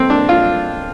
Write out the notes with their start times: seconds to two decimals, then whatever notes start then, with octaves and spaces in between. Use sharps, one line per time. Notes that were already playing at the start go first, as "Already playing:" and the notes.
Already playing: A3 C4
0.10 D4
0.29 F4